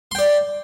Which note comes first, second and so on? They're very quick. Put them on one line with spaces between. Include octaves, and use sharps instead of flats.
C6 G5 D5